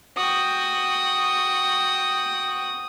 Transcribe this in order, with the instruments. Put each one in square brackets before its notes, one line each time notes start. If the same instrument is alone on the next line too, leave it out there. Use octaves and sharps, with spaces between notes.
[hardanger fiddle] F#4 G5 [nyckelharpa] D#6